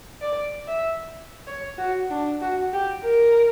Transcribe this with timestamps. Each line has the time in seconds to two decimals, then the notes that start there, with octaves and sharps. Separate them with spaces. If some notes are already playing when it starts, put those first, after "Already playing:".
0.21 D5
0.68 E5
1.47 C#5
1.78 F#4
2.10 D4
2.41 F#4
2.73 G4
3.04 A#4